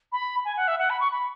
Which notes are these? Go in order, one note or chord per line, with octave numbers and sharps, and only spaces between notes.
B5
G#5
F#5
E5
F#5
B5
C#6
B5